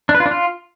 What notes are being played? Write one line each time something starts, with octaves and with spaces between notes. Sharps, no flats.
D4
B4
F4
D4
F4